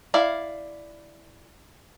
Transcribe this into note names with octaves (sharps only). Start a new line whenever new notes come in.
E4 D5 F5